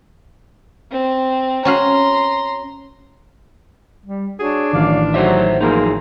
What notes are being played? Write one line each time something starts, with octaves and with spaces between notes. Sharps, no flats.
C4
C#4 F#4 F5 A#5 C6
G3
D4 F#4 G#4 C#5
A1 F#2 D#3 D5 F5
F#3 A4 C5 E5
F3 F#3 A#3 D#4 G#4 C6